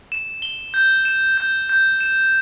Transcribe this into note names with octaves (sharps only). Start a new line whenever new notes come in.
E7
G7
G6
E7
G6
G6
E7